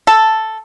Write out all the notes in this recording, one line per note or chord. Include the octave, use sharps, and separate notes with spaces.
A4